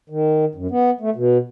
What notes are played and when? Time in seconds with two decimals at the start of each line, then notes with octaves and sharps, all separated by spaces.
0.10 D#3
0.55 F#2
0.71 B3
1.01 A3
1.16 B2